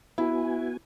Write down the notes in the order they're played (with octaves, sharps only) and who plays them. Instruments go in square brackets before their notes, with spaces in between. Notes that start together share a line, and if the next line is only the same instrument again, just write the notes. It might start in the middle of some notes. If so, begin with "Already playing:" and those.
[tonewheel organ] B3 F#4 G#5 [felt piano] E4